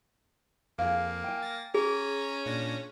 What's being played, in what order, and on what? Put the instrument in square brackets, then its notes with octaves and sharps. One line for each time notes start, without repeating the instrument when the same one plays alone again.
[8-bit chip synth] F2 [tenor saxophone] A#3 [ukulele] G#4 F5
[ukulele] G5 G#5
[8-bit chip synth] A6 A#6
[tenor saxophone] C#4 [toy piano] G#4 [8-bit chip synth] C#5 A#5
[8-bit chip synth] A#2 D4 A#6